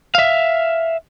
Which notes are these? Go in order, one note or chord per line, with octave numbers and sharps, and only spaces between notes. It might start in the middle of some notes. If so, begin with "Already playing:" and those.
E5 F5